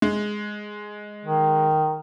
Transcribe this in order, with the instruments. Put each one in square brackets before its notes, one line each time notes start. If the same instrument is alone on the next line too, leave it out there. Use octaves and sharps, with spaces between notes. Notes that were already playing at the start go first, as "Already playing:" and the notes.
[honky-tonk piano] G#3
[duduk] D#3